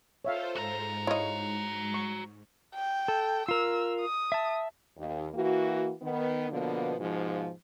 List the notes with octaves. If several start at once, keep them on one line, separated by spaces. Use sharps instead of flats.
F4 A4 C5 C#5 E5 F5
G#2 F#4 A#5
E4 C5 C#5 D#5 F5
C#6
G5
A4
F4 A#4 E6
D#6
E5 A5
D#2
E3 A#3 F#4
D#3 B3
B2 D3 F3 A#3 B3
G#2 B2 F3